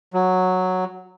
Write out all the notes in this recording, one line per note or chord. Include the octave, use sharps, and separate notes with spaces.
F#3